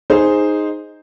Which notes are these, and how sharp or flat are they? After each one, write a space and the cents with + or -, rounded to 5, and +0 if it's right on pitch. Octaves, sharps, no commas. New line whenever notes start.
D#4 +0 G#4 +0 C5 +0